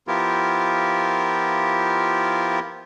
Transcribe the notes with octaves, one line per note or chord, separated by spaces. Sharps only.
F3 B3 E4 F4 G4 A#4